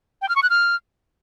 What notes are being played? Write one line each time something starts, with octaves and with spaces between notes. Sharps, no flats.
G5
F6
C#6
F#6
F6